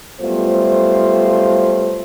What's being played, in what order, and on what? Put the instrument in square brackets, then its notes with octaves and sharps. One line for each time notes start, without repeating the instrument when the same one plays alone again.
[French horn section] F#3 G3 A3 B3 F4 C5